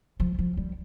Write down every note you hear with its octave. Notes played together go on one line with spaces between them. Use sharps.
F3
F3
G3